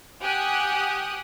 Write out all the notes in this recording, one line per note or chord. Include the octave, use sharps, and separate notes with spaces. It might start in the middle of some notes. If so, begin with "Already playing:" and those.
G4 F#5 G#5 D#6 F#6